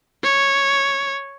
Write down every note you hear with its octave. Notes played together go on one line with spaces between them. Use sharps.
C#5